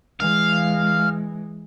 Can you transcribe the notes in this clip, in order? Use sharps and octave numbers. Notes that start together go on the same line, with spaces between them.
E3 G#3 F5